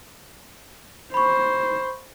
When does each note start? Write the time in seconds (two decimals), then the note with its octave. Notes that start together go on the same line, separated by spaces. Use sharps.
1.14 C5 B5 C#6